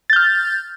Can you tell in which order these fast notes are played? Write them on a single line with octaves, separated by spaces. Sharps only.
A6 G6 F6